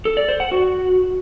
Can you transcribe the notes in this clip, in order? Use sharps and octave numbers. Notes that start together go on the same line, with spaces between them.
A4
D5
C5
F#5
F#4